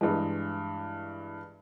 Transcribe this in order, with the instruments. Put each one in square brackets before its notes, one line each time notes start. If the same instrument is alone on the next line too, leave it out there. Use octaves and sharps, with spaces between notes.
[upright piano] G2 E3 G#3